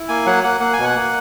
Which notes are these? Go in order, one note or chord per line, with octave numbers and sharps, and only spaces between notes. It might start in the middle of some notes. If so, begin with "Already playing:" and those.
Already playing: E4
A#3 G#5
F#3 F#5
A#3 F#5
A#3 F#5
G#5
B2
F#5
A#3